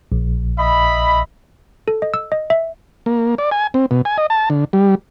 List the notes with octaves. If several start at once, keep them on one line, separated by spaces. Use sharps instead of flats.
A#1
D#5 E5 B5
A4
D#5
E6
D#5
E5
A#3
D5
G#5
C4
B2
G#5
D#5
A5
D3
G3